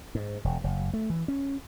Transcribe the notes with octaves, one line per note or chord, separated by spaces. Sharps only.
G#2
E1
F#1
A3
E3
C#4